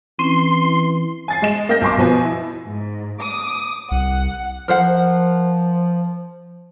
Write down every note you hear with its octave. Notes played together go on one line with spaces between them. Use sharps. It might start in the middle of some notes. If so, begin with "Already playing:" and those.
E3 C4 C#4 C6
G#5 A6 C7
G#3 D#5 E7
A#3 D#5 G5 G6 A#6
B1 G#5 C6 D6
B2 F3 B3 G#5
E4
G#2
D6 D#6
C2 F#5
F3 A#4 C5 F#5